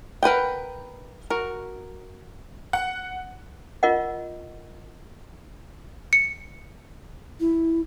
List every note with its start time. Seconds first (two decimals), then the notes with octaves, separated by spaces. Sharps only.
0.23 A#4 B4 F#5 G5
1.30 F#4 A#4
2.73 F#5
3.83 F4 A#4 D#5 F#5
6.13 C#7
7.40 E4